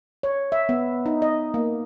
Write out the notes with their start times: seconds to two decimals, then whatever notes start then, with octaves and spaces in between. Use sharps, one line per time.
0.23 C#5
0.52 E5
0.69 B3
1.06 D#4
1.22 D#5
1.54 A#3